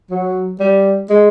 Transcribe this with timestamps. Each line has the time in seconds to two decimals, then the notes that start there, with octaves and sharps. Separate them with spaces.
0.11 F#3
0.60 G3
1.10 G#3